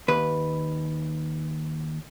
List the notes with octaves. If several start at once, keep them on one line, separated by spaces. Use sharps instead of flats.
D#2 B4